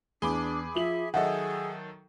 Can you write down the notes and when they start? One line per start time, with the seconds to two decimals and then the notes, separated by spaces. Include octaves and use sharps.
0.22 E2 D4 G#4 B5 D6 G7
0.75 F3 E5 F#7
1.14 D#3 F#3 G#4 A4 D#5 E5 F#5